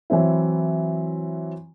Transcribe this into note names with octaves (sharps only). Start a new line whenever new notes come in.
E3 F#3 C4 E4